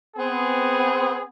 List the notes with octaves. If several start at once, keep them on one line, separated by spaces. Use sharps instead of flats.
B3 C4 G#4